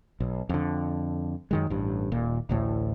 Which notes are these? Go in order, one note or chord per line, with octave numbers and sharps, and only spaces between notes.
B1
F2 D3
F#2 D#3 G#3
A1 G2
D#1 A#2
A1 D2 A2